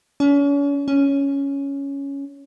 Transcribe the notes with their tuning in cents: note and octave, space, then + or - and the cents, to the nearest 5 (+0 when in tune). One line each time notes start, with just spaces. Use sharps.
C#4 +40
C#4 +5